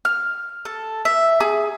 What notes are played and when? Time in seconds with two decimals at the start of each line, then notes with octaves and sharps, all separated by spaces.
0.05 F6
0.65 A4
1.05 E5
1.40 G#4